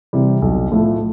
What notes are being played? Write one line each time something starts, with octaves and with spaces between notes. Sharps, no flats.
C3 E3 G3
B1
A2 F3 A3